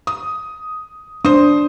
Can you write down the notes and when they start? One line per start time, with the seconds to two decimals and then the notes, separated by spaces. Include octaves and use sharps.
0.07 D#6
1.25 D4 C5 D#6